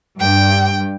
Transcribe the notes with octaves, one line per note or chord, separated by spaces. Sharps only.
G2 G5